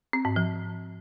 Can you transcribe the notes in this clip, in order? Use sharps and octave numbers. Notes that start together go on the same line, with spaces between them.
C4
G#2
F3